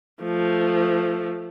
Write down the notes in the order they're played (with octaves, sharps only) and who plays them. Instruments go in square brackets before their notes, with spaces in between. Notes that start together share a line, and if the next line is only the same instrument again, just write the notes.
[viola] F3 A3